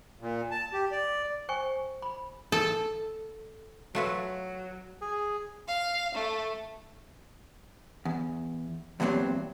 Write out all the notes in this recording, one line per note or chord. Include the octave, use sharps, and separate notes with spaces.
A#2
A5
G4
D5
C5 G5 G#5 C#6
B5
A4
F#3 A3 F4 B4
G#4
F5
A3
E2
E2 G2 A#2 F#3 C4